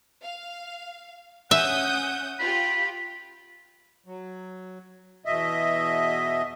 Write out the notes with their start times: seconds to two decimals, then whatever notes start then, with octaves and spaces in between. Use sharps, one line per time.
0.24 F5
1.51 C#4 E5 F#5 D#6 G6
2.40 F4 G4 B5
4.06 F#3
5.25 E2 B2 D#5 E5